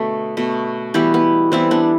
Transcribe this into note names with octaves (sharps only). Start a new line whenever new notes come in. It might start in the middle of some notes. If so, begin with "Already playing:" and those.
Already playing: B2 D3 A3
B2 A3
E3 G3 B3 E4 G4
B3
E3 G3 B3 C4 E4
B3 D4